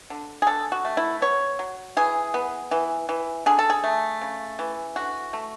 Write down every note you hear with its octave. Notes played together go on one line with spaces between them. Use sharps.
D3
G#4
D3 A4
F#4
A3
E4
B3 C#5
F#3
E3 G#4
B3
E3
E3
D3 G#4
A4
G#4
A3
C#3
E3
D3 F#4
A3